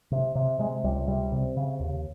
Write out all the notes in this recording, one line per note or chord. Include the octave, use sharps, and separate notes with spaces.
C3
C3
C3 G#3
C#2 G3
C3 G3
C3
C#3
D#2